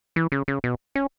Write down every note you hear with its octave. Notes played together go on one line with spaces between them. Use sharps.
E3
C#3
C#3
B2
C#4